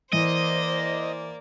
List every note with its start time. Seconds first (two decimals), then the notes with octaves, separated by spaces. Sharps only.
0.13 E3 A#3 C5 D5 D#5